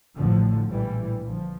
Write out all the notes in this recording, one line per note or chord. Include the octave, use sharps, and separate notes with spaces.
A1 A2 D3 F3
A#1 A2 E3 G3
A#1 A#2 D3 F3